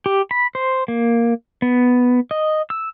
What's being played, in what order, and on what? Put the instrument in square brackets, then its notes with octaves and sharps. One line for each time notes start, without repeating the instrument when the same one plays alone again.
[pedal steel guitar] G4
B5
C5
A#3
B3
D#5
E6